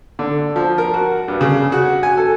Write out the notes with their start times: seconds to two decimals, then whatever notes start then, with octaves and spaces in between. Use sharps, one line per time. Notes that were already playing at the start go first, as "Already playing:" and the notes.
0.19 D3
0.56 F3
0.78 A#4
0.94 F#4
1.28 G2
1.41 C#3
1.72 F#4
2.03 G#5
2.17 A4